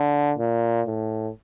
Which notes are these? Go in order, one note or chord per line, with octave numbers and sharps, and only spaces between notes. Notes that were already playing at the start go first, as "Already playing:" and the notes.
Already playing: D3
A#2
A2